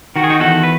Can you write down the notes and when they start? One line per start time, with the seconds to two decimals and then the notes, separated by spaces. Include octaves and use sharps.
0.16 D#3 F#4
0.24 G#4
0.30 D#4 F#4
0.40 E2 F#4 A4
0.63 B4